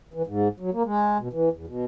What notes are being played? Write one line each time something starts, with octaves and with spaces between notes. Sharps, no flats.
E3
G#2
F#3
A#3
G#3
B2
E3
E2
B2